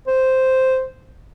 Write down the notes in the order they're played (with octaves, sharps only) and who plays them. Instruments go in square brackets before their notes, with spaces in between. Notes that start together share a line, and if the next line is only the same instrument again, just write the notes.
[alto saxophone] C5